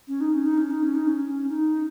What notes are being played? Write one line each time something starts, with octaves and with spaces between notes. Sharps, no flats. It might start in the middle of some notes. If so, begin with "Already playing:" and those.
C#4
D#4
C#4
D#4
C#4
D#4
C#4
D#4
C#4
D#4